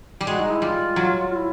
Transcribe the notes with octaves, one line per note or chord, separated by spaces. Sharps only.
G3
G#3 F#4
D#4
E4
G3 F4
F#3
F4
E4